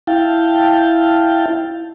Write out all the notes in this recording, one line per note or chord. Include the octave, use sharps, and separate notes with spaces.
E4 F5 G5 A5